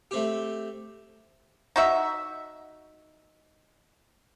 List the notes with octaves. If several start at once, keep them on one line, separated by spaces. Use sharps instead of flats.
A3 C4 G4
D#4 F#4 E5